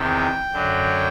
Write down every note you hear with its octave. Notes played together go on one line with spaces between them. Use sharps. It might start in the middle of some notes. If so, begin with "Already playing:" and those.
Already playing: E2 C3 D#3 G5
F#2 D3 F#3